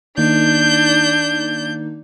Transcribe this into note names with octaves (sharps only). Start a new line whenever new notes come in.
D#3 A#3 D4 D#4 G6